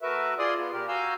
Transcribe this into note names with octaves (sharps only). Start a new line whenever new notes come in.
A3 F#4 A#4 B4 E5
F4 G#4 D5 C6 D#6
B3 F4
A#2 G4 A#4
F#4 F5 G#5 A#5 E6 G6